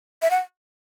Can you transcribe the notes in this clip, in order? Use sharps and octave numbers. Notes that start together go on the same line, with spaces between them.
E5
F#5